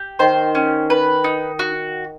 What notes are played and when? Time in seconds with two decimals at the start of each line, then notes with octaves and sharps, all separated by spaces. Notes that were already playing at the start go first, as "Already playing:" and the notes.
Already playing: G4
0.19 D#3 C5
0.55 C#4
0.90 B4
1.24 D#4
1.59 F#4